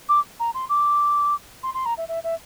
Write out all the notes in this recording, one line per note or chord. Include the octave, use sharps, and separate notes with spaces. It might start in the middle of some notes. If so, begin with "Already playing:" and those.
D6
A#5
C6
D6
C6
C6
A#5
E5
E5
E5